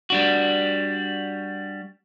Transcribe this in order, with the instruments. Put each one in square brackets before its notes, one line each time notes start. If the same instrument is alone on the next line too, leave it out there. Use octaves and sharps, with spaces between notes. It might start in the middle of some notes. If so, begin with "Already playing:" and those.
[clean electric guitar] G3 D4 F#4